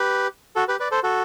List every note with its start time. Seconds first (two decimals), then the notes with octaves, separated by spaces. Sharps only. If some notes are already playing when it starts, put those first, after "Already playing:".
Already playing: G4 B4
0.56 F#4 A4
0.68 G4 B4
0.80 B4 D5
0.91 A4 C5
1.03 F#4 A4